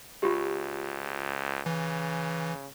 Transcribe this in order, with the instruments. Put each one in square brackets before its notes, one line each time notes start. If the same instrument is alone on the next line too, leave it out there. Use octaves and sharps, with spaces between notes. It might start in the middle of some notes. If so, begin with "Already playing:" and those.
[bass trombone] C#2 [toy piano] F4 G4
[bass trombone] C#3 [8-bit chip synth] E3